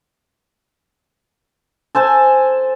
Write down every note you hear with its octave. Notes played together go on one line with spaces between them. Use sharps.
A4 C5 G#5 A5